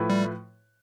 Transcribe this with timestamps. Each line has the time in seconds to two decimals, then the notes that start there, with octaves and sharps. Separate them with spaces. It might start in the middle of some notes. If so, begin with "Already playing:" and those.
Already playing: A2 F3 A3 E4 B4
0.10 G3